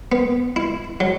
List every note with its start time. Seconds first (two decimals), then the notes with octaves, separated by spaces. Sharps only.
0.12 B3
0.56 E4
1.00 F#3